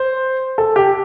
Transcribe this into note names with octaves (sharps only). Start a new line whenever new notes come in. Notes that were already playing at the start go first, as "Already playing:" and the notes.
Already playing: C5
A4
G4